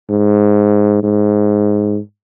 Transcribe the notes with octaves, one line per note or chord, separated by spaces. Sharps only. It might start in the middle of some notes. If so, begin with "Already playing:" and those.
G#2
G#2